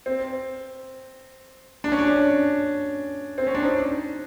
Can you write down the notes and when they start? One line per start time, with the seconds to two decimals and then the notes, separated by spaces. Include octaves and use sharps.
0.06 C4
1.84 D4
1.92 C#4
1.99 D4
3.38 C4
3.47 C#4
3.55 D4
3.62 D#4